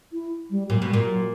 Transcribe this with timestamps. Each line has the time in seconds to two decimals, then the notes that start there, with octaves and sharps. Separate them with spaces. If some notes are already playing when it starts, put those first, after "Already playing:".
0.13 E4
0.50 G3
0.69 A#2 F#3
0.82 B2
0.88 G3
0.93 A#2
1.06 F#3